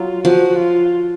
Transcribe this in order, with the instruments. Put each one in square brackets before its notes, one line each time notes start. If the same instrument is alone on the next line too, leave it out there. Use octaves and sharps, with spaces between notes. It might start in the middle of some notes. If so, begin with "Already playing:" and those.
Already playing: [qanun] F#3 [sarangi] F4
[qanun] F3 [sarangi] F#4
[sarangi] F4